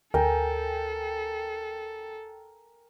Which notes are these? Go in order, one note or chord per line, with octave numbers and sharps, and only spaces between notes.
D2 A4 A#4 G5 G#5